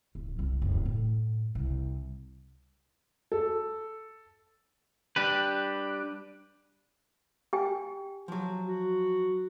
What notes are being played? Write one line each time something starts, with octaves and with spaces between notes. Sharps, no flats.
D1
C2 E3
D1 F#2
A2
C2
A4
G3 D4 G4 B4
G4 G5 G#5
F3 F#3
F#4